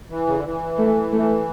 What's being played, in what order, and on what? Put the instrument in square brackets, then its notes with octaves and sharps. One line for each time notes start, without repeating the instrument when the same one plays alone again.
[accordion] E3
C#3
D3
E3
[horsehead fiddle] A3
A3